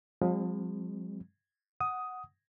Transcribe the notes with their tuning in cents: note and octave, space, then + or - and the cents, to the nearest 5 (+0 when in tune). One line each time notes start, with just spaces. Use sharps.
F3 +35 G#3 -40 C4 +0
F#5 +0 D#6 +10